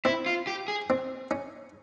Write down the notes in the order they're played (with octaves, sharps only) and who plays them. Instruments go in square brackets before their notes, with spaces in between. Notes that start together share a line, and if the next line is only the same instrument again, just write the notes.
[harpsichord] C4 [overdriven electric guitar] E4
[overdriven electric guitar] F4
G4
G#4
[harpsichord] C4
C#4